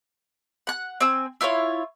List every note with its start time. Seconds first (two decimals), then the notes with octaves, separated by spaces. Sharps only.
0.67 F#5 F#6
1.01 C4 G#5 E6
1.41 E4 F4 C5 C#5